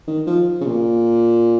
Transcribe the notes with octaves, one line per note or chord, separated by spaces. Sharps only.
D#3
F3
C#3
A#2